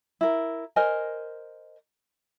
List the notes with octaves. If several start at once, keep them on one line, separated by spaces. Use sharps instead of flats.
E4 A#4
A#4 C5 D#5 G#5